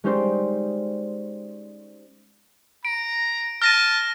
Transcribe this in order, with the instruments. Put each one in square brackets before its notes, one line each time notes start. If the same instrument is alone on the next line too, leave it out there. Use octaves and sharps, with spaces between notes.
[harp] G#3 C#4 D#4 G4 C5 D5
[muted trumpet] A#5 [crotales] D7
[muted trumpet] A5 [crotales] F6 A#6 D#7